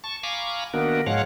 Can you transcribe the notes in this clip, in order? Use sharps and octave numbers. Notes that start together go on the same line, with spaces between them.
A5 C#6
F5 G#5 A#5 B5 C#6 D6
D#3 A#3 B3 D4 F#4 A#4
G#2 F3 G#3 C#5 F5 F#5